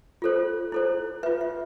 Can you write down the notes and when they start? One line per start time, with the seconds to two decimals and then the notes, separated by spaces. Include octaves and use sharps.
0.22 F4 A4 C5
0.72 E4 A4 C5
1.23 F4 B4 E5
1.41 E5